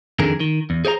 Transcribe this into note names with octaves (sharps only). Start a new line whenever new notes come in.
F2 D3 D#3 G#4 A#4
D#3
E2
G#4 C5 D5 A#5